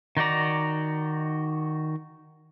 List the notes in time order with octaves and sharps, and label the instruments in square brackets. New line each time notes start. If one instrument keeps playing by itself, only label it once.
[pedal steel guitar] D#3 D#4 F#4 D5 A#5